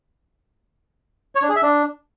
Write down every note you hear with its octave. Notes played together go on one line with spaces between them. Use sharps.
C#5
D4
G#4
E5
D4